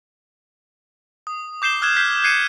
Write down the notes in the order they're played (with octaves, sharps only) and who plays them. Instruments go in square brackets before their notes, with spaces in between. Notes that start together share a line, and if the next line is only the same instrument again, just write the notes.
[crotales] D#6
D6 G6 C7 E7 G7
D#6 F6 F#6 G#6 E7
F6 G6 B6 C7
F#6 G#6 C7 C#7 D#7 E7